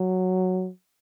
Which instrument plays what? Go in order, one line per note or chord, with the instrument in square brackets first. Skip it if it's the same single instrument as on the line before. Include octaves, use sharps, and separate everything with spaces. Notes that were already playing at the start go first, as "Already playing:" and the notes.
Already playing: [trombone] F#3